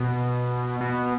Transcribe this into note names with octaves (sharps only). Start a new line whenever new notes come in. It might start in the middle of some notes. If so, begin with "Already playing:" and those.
Already playing: B2
B2